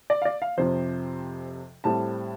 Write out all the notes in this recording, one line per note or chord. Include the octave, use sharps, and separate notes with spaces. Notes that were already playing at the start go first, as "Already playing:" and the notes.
D5
F5
D5
F5
F2 C3 F3 C5
A2 G3 C4 A5